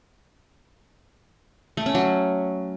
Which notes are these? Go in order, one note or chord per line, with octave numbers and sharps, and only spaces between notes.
A3
C#4
F#3